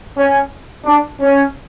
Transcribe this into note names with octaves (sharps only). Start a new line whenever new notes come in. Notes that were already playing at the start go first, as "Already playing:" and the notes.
C#4
D4
C#4